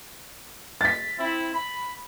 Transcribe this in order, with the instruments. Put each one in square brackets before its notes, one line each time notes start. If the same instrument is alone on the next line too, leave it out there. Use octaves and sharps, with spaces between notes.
[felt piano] A6 B6
[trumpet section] C4 E4
B5